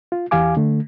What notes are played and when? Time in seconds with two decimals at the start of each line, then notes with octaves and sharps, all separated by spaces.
0.12 F4
0.31 E2 E3 G4 F5 G#5 D6
0.57 D3 A3